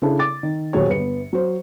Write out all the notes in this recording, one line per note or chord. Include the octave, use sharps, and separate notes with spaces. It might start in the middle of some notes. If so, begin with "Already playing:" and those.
C#3 D4 E4 G#4 A4
D6 A6
D#3
D#1 E2 F#3 G#4 C#5
G1 B3 C#7
F#3 C5